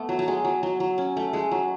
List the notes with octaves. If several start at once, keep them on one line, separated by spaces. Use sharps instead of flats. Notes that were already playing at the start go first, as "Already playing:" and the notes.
Already playing: A3 B3
F#3
F#3
G#3
F#3
F#3
F#3
C#4
A3
G#3
F#3